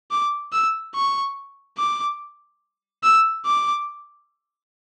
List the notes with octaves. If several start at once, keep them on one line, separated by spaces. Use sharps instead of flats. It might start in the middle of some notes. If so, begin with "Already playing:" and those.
D6
E6
C#6
D6
E6
D6